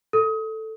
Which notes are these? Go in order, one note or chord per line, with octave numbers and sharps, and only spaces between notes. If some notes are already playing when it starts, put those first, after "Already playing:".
A4